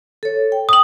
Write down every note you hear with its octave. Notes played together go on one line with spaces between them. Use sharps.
A4 C#5
G5
D#6 F#7